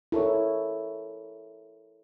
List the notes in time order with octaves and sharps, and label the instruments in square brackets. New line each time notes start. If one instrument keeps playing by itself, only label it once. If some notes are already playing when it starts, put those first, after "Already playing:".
[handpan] E4 A4 A#4 C#5